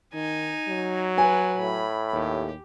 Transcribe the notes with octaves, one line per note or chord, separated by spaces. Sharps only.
D#3 D#4 G#5
F#3
B4 G#5
A2 B5
D#2 G4